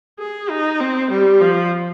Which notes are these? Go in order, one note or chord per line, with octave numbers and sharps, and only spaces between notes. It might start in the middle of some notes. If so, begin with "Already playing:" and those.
G#4
D#4
C4
G3
F3